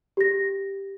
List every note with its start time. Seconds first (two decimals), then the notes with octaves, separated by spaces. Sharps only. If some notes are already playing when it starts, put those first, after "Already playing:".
0.17 G4 A#6